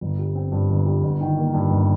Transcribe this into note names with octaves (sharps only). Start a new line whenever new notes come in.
G1
G3
C4
G2
G1
G3
G1
D#3
A#3
G2
G1